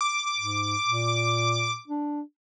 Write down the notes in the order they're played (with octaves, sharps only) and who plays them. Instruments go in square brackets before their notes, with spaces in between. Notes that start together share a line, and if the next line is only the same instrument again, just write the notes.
[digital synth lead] D6
[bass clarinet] G#2
A#2
D4